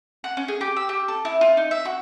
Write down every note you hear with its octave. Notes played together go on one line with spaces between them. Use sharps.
F#5
C#4
G#4
G4
E6
G4
A4
E4
F4
D#4
E5
F#4